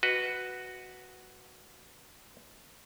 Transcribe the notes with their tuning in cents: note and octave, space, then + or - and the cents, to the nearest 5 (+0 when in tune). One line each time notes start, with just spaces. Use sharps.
F#4 +0 B4 +0 D#5 +0